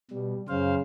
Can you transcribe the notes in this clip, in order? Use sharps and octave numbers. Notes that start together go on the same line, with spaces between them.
B2 G3
F#2 C#3 C5 F5